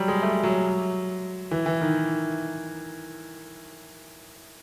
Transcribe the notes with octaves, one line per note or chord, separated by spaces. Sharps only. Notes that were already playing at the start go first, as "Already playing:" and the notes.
Already playing: F#3 G3
G#3
A3
F#3
E3
E3
D#3